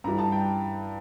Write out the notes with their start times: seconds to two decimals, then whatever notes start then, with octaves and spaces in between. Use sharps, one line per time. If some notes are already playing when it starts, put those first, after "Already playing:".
0.04 G2 E3 G3 A#5
0.19 A5
0.32 G5